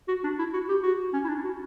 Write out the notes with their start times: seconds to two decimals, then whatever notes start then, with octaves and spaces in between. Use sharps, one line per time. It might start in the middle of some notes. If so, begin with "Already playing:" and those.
0.08 F#4
0.24 D4
0.39 E4
0.54 F#4
0.69 G4
0.83 F#4
1.13 C#4
1.24 E4
1.29 D4
1.44 F#4